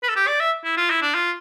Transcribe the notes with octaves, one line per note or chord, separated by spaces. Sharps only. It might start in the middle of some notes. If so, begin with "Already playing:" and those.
B4
A4
G4
D5
E5
E4
F4
E4
D4
F4